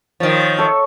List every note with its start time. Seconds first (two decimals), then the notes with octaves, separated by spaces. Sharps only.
0.20 D#3 F3 C#5
0.58 A4 C#5 E5